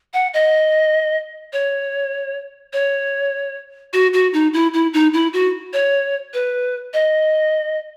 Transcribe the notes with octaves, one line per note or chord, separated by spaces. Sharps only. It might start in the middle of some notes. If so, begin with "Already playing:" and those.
F#5
D#5
C#5
C#5
F#4
F#4
D#4
E4
E4
D#4
E4
F#4
C#5
B4
D#5